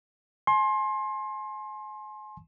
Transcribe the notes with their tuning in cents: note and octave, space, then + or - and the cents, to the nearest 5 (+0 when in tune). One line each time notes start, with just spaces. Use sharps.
G#5 +35 C6 +25